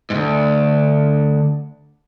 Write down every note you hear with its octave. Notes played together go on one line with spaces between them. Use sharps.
D2 G#2